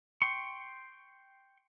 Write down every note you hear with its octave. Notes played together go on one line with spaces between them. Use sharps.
G5 C6 C#6